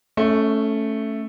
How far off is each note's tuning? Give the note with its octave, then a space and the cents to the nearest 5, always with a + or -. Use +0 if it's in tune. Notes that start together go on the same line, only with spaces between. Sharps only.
A3 +0 C#4 +0 E5 -40